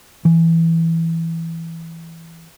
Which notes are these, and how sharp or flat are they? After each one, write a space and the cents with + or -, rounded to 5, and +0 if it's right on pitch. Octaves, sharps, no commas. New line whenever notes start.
E3 +0